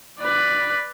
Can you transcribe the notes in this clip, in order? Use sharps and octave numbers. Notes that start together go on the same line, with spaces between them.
B4 D5